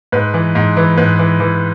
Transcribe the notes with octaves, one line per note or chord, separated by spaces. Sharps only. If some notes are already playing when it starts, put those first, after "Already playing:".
G#2 B4
E3
G#2
E3
G#2 B4
E3
E3